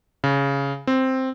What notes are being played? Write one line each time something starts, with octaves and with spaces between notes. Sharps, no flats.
C#3
C4